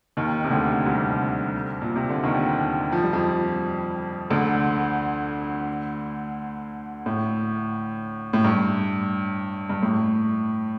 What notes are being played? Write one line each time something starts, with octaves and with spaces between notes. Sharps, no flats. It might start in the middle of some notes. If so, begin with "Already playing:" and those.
D#2 D#3
C3
D2 D3
C2 C3
A#2
C3
D3
D#2 D#3
F3
G3
F2 F3
D2 D3
A2
A2
G2
G2
A2